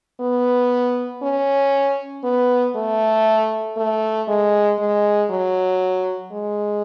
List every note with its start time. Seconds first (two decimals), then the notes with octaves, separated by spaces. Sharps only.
0.20 B3
1.23 C#4
2.24 B3
2.76 A3
3.77 A3
4.28 G#3
4.79 G#3
5.30 F#3
6.32 G#3